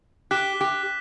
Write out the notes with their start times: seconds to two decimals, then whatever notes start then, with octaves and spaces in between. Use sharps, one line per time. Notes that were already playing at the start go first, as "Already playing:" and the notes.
0.31 G4 F#6 B6 E7 G7
0.61 G4